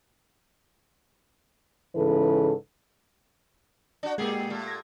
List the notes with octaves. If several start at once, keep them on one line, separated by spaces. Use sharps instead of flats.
G#2 C#3 E3 A4 B4
D4 F#4
A#2 G#3 A#3 G4 G#4
A#2 A3
G#6 A#6